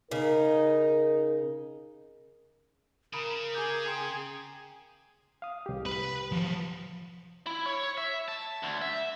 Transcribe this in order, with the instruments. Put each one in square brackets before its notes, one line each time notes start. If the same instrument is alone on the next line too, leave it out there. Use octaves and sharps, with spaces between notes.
[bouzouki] C#3 [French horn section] D#4 [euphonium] A#4
[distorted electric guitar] C#3 [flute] A#4 [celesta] A#5 B5 D#6
[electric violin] G#4 G#5 [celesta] A#5 D6 G6
[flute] G5 [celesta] A#5 C6 C7
[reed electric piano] F5 D#6
C2 G4
[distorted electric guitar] B4 B5
F3 F#3
[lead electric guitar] E4
C#5
E5
A5
D2
E5